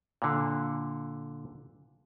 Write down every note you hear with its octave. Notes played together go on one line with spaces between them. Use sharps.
A#2 D3